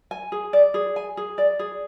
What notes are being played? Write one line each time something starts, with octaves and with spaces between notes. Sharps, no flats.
G#5
G#4
D5
G#4
G#5
G#4
D5
G#4